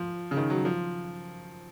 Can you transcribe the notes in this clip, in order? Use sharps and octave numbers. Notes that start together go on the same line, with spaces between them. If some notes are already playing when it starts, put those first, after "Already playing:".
Already playing: F3
C#3
D#3
F#3
F3